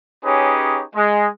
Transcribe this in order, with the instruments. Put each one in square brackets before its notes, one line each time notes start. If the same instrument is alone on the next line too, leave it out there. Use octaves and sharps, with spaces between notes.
[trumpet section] C#4 D#4 G4 G#4 B4 C#5
G#3